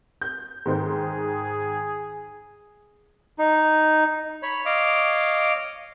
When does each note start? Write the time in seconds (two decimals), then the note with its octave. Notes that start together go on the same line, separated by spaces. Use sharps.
0.22 G6
0.66 G#2 D#3 G#4 C5
3.39 D#4
4.43 C#5 B5
4.65 D#5 F5 D6